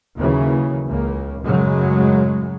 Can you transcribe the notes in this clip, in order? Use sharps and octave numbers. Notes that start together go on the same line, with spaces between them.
D#2 C#3 E3 F#3
C#2 C#3 A#3
F#2 A2 C#3 F#3 G#3